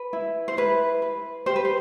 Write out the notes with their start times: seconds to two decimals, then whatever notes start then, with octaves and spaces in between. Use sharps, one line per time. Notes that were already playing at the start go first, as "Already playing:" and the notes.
Already playing: B4
0.13 E4
0.48 C5
0.57 E4 B4
1.02 B4
1.46 G4 C5
1.56 B4
1.65 C5